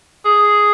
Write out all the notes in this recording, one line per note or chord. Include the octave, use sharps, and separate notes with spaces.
G#4